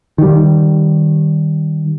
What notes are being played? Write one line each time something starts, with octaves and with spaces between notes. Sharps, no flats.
D#3 G3